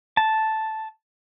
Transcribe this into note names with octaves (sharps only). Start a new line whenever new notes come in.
A5